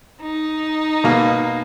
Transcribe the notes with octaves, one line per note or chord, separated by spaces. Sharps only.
D#4
B2 A#3